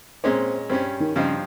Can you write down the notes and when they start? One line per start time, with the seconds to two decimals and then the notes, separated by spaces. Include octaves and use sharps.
0.24 A#2 G#3 C4 C#4
0.69 G2 G3 C4 C#4
1.00 D#3
1.15 G2 C#3 F3 C4 D#4